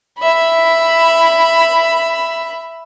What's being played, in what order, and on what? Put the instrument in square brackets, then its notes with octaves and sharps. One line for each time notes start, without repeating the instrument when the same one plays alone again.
[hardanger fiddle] E5 B5